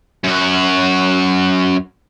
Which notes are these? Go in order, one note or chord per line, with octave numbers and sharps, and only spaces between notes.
F#2 F#4